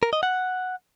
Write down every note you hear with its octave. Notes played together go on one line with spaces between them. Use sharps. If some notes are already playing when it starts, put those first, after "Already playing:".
A#4
D#5
F#5